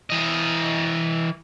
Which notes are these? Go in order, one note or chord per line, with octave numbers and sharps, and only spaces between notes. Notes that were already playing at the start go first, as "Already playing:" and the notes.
E3 D#5